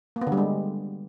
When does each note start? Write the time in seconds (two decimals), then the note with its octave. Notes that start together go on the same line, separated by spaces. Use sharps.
0.16 A#3
0.21 B3
0.27 D3
0.32 G3
0.37 G#3